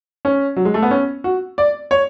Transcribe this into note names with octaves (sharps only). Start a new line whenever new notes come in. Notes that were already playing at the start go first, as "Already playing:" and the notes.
C#4
F#3
G#3
A3
B3
C#4
F#4
D5
C#5